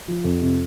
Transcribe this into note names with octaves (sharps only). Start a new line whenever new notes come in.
F3
F2
C3